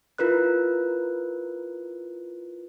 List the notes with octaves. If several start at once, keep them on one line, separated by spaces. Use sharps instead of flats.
E4 F4 A#4 B4 F#6